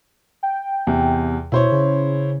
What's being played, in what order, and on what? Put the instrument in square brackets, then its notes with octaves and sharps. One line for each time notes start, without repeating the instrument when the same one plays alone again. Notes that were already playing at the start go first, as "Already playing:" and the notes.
[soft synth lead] G5
[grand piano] E2 C3
[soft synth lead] B2 [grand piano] E4 C5 C#5
[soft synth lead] C#3